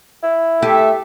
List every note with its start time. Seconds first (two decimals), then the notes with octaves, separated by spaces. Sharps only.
0.23 E4
0.63 A3 G4 A4 E5